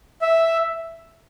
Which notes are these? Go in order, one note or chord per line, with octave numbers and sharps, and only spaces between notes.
E5